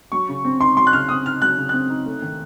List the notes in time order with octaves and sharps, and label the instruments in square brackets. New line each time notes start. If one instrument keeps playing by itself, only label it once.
[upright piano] F#3 [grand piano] C#6
[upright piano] C#3
C4
[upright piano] D#4 [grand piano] C6
[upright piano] F#3 [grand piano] C6
[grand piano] F#6
[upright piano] C#3 [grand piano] F6
[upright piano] C4 [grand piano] D#6
[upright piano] D#4 [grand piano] F6
[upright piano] F#3 [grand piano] F#6
[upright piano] C#3
[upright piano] C4 [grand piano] F#6
[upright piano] D#4
A3
D#3